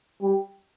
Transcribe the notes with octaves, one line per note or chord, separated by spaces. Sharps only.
G3